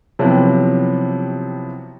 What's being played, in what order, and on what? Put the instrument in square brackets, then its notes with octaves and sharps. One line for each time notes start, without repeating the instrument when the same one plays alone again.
[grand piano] C3 F3 F#3 B3 E4 G4